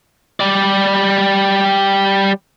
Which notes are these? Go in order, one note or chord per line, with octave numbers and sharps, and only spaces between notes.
G3 D5